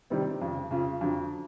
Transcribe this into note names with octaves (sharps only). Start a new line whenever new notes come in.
C3 D#3 G3 C4
F2 C#3 F3
F2 C#3 F3
F2 D3 F#3